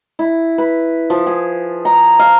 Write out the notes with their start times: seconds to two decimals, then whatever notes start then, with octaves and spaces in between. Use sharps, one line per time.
0.19 E4
0.58 B4
1.10 F3
1.26 G#4
1.85 A#5
2.19 F5